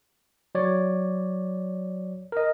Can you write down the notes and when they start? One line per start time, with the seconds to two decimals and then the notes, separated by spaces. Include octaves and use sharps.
0.55 F#3 C#5 D5
2.32 A#4 D#5